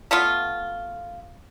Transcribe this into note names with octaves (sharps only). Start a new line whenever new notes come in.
A3 B3 F4